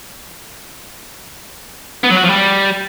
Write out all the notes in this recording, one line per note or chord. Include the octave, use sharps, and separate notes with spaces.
B3
F#3
F#4
F3
G3